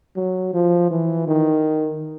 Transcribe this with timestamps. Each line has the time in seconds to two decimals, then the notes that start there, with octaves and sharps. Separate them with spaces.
0.16 F#3
0.54 F3
0.90 E3
1.27 D#3